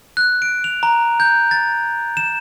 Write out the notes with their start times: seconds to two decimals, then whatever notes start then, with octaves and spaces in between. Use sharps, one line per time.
0.17 F#6
0.42 D7
0.64 F7
0.83 A#5
1.20 G6
1.51 A6
2.17 E7